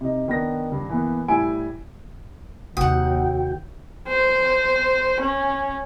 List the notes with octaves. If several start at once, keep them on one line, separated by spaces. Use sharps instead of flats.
C3 D#4
D#3 B3 D4 A#6
D#1 G2
E3 A#3 B3
A2 G3 E4 G#5 D7
D#2 C3 G#3 F#4 F#5 G5 D#6
C5
C#4